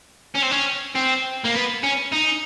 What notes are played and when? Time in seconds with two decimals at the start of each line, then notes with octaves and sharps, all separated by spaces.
0.35 C#4
0.43 C4
0.51 C#4
0.95 C4
1.44 A#3
1.54 B3
1.83 C#4
2.13 D#4